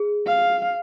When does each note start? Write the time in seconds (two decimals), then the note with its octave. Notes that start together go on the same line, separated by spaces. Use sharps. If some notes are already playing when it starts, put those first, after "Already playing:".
Already playing: G#4
0.27 F5